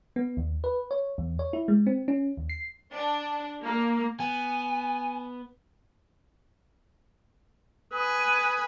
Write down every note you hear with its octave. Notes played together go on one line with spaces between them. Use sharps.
B3
D#2
B4
C#5
E2
C#5
E4
G#3
C4
C#4
D#2
C7
D4
A#3
B3 G#5
B4 G#5 D#6